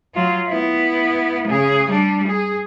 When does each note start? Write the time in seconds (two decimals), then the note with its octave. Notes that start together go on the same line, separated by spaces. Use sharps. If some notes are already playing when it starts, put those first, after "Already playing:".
0.14 F#3 F4
0.48 B3 E4
1.47 C#3 G#4
1.88 G3 D4
2.27 G#4